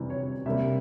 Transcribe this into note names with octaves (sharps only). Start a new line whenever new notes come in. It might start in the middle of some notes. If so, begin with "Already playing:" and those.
Already playing: C3 E3 G3
C#5
C3 G3 A#3 E5